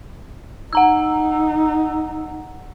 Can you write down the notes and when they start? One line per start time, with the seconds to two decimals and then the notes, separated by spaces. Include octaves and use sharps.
0.73 D#4 F#5 A#5 E6